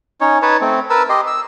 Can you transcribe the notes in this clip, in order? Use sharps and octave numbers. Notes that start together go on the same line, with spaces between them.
C#4 D#4 C#5
D#4 B4 C#5 A5
A3 C4
A#4 B4 A5 E6
G4 D#5 C6
E6